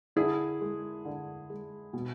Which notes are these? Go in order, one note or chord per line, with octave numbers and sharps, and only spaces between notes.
D3 E4 G#4
G#3
D3
G#3
B2